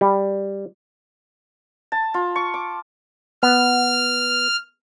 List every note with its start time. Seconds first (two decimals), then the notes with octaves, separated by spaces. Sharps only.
0.01 G3
1.92 A5
2.14 F4
2.36 C#6
2.54 D6
3.43 B3 F6